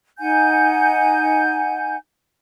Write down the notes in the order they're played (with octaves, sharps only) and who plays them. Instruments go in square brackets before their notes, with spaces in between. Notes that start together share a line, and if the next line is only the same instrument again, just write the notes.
[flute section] D#4 F#5 G#5 G6